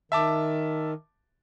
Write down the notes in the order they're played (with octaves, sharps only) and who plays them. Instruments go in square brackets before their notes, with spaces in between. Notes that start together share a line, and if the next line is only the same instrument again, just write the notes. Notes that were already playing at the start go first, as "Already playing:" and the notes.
[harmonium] D#3 [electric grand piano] E5 A5 D6